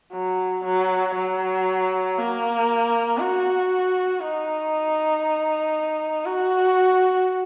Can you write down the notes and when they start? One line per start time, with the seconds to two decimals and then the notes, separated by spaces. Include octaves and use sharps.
0.13 F#3
0.64 F#3
1.15 F#3
2.17 A#3
3.19 F#4
4.20 D#4
6.25 F#4